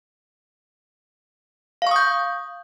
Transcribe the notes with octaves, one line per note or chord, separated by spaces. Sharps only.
F5 C#6 D#6 G6